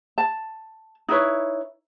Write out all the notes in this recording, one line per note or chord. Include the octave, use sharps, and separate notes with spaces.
A5
D#4 E4 B4 C#5